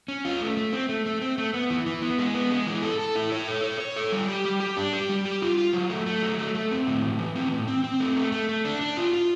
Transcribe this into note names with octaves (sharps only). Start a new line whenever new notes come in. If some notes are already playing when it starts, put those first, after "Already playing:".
C#4
F4
A3
A3
C4
A3
A3
C4
A3
B3
E3
E3
B3
G#3
B3
G#3
E3
A4
A4
E4
C#5
A4
C#5
C#5
A4
G3
G4
G3
G4
D4
G4
G3
G4
F4
F4
F#3
A3
A3
F#3
A3
A3
C4
A2
E3
E3
C4
A2
C4
C4
A3
A3
A3
A3
D4
D4
F4
F4